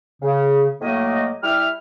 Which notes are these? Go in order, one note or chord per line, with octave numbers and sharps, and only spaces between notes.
C#3
A2 F#3 A3 A#3 D#5
G3 E4 E5 F6